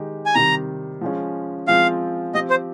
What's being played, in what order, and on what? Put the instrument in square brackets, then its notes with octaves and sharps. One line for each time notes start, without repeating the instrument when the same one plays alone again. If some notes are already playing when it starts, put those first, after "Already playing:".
Already playing: [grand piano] D#3 G#3 D#4 G4
[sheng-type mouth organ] G#5
[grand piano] C3 D#3 G3 [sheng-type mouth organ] A#5
[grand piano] F3 G#3 C#4
[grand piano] F3 G#3 C4 F4 [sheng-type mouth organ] F5
[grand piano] F3 C4 G4 [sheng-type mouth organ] D#5
[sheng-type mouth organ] C5